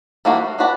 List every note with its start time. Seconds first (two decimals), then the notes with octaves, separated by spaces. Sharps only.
0.25 E3 G3 A#3 D4 F#4
0.59 D4 F#4 B4 D5